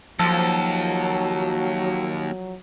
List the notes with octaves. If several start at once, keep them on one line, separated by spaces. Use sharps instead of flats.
D#2 F3 F#3 A4